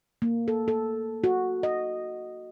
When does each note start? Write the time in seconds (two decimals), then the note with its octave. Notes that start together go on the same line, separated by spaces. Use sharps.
0.22 A#3
0.48 A4
0.68 A4
1.24 F#4
1.63 D#5